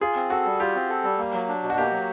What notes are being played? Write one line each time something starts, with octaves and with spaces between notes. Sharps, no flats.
F4 G#4
C4
F#4 A4
G3
F4 G4
C4
A4
G3
A#3
F#3
D4
B2
F#4
A#3 G4
F#3